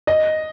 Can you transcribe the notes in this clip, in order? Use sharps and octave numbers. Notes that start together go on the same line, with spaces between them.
D#5